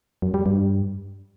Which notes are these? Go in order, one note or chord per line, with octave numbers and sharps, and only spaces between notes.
F#2
G3
G2